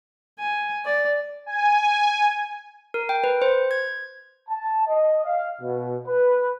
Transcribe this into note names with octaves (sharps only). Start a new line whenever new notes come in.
G#5
D5
G#5
A#4
G5
B4
C5
G#6
A5
D#5
F5
B2
B4